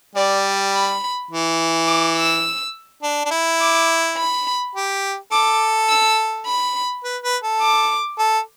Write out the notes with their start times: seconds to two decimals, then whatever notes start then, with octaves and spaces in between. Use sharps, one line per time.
0.15 G3 D5
0.73 B5
1.31 E3
1.87 D6
2.17 E6
3.03 D4
3.25 D4
3.31 E4
3.61 D6
4.17 B5
4.75 G4
5.32 A4 D6
5.89 E6
6.46 B5
7.04 B4
7.23 B4
7.43 A4
7.61 D6
8.19 A4